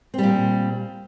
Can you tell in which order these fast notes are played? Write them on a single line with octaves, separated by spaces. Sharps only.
C4 G3 A#2